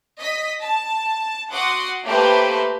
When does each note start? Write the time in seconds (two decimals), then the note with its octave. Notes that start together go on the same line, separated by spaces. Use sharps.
0.20 D#5 B6
0.63 A5
1.53 F#4 F#5 C6 D6 D#6
2.04 A3 A#3 G4 B4 C5